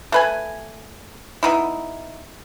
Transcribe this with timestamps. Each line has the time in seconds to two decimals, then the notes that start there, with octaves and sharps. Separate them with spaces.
0.12 A3 B4 G#5
1.43 B3 D#4 E4